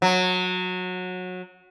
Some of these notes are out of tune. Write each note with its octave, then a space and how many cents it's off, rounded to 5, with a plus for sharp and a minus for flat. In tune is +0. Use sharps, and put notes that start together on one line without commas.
F#3 -20